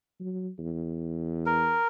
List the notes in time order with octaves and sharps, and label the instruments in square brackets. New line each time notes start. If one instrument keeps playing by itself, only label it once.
[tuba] F#3
E2
[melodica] A#4